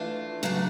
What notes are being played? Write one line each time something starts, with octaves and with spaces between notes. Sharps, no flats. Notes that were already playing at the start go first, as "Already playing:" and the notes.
Already playing: E3 A3 D4 F4
C#3 F#3 A3 D4